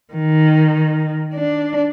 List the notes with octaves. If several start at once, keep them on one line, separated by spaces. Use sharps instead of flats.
D#3
D4